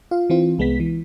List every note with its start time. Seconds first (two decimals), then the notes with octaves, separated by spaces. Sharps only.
0.11 F4 F5
0.30 E3 C4 F4
0.58 C2 G#3 B3 B6
0.80 E3